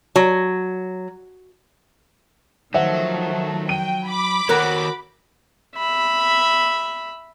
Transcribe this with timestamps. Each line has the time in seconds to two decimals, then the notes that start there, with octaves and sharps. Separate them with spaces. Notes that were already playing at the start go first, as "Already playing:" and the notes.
0.16 F#3
2.74 D#3 F3 F#3 A3 C5 E5 F#5
3.69 G5 D#7
4.07 B5 D6
4.49 D#3 F#4 A#4 C#5
5.77 E5 B5